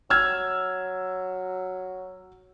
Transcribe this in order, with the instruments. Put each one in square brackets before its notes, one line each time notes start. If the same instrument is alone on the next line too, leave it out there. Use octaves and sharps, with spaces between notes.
[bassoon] F#3 [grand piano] E6 F6 G#6